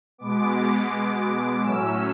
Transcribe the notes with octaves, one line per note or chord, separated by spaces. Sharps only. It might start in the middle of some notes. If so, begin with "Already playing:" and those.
B2 G#3 B3 D6
A2 F#3 C#4 E6